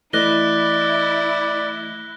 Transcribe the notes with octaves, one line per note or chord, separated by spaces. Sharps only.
E3 A3 E4 D5 D#5 F#6 A#6 G7